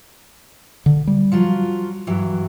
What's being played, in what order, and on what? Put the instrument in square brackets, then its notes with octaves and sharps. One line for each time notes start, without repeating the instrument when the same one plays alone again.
[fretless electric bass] D3
G3
[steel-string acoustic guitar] F3 F#3 F4
G2 E3 F#3